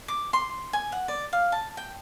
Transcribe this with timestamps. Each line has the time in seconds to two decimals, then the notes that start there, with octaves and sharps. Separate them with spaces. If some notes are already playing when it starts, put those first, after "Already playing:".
0.08 D6
0.33 C6
0.73 G#5
0.92 F#5
1.08 D5
1.33 F5
1.52 A5
1.77 G5